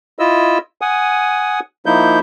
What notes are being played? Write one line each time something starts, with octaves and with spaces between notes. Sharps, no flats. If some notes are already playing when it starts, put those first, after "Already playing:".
E4 F4 D#5 E6
F#5 G#5 D#6
F3 A#3 D#4 E4 G6